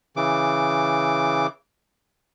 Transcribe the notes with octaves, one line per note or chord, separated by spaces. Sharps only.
C#3 E3 D6